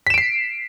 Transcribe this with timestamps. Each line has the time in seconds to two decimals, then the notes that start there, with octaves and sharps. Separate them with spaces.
0.07 B6
0.10 E7
0.14 D7
0.18 C7